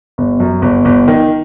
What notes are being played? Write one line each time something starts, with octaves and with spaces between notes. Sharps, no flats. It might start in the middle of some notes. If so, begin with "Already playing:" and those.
G1
F#2
G1
G1
D#3